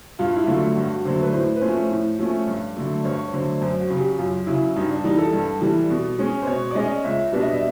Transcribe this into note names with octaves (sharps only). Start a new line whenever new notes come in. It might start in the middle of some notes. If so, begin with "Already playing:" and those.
G2 F4
E4
D3 F#3 A3 F4
G2 F#4
D3 F#3 A3 C5
B4
A2 C5
B4
F3 A3 C#4 C5
A2
F3 A3 C#4
G2
D3 F#3 A3
G2 C#5
D3 F#3 A3 C5
F#2 C5
F#4
C#3 F#3
G4
F#2 F4
C#3 F#3 E4
G2 D#4
D4
E3 G3 D#4
A4
G2
E3 G3
B2
G#3 C#4
C5
B2 C#5
D5
G#3 C#4 D#5
C#2 E5
B2 G3 B3 D4 E5
D#5
E5